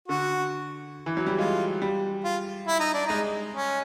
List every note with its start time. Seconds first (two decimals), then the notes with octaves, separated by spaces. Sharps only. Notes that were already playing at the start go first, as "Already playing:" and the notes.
0.08 D3 F#4
1.06 E3
1.17 F#3
1.27 G3
1.39 G#3 F4
1.82 G3
2.24 F4
2.67 E4
2.80 D#4
2.94 D4
3.07 G#3 D#4
3.54 C#4